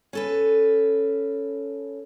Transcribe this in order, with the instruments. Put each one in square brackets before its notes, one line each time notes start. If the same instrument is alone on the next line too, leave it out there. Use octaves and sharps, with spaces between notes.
[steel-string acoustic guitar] C#4 A4 B4